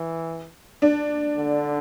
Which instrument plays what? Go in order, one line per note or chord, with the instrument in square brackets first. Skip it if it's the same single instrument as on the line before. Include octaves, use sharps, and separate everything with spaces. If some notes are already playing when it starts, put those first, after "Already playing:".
Already playing: [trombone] E3
[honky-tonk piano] D4
[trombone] D3